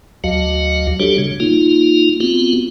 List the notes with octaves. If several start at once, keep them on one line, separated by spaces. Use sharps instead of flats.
D2 F#3 F#4 D#5 F5
G3 D4 F#4 G4 A4 C#5
C#3
A#3 D#4 F4
B3 C4 F4 F#4